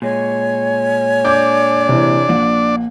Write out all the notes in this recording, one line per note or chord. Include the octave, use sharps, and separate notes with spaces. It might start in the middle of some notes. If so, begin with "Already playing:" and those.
A#2 G#3 C#5 G#5
D4 D5 D6 G6
C3 E3
A#1 A#3 F#5